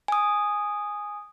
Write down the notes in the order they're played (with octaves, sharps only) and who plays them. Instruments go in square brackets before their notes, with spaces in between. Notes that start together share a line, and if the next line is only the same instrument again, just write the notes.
[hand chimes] G#5 D#6